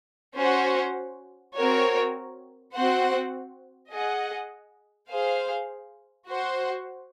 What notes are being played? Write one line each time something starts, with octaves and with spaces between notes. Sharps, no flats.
C#4 F#4 C5 F#5
C4 F#4 A#4 C#5
C4 F#4 C5 F#5
G#4 D#5 F#5
G#4 C5 F5
F#4 C5 F#5